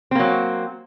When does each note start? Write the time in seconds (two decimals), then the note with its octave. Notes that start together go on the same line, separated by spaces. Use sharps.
0.11 C4
0.15 A#3
0.20 F#3